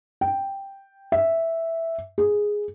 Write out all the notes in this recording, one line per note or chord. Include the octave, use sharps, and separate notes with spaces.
G5
E5
G#4